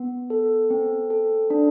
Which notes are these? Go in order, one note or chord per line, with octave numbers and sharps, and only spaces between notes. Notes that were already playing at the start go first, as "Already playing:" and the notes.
Already playing: B3
A4
C4
A4
D4